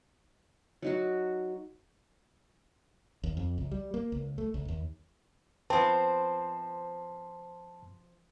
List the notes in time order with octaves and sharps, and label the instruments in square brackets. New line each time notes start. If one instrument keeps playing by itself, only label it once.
[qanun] F#3 D#4 F#4
[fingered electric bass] D#2
F2
C#2
G3
A#3
C#2
A3
C#2
D#2
[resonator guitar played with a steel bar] F3 C4 [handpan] B4 [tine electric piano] A5